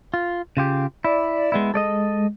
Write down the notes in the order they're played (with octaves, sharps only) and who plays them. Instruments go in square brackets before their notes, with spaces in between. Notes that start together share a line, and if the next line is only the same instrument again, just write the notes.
[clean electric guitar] F4
C#3 F4 G4
[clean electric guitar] E4 [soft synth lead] D5
[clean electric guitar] G#3 B3 E4
[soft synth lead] G#3 [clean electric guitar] A4 D5 D#5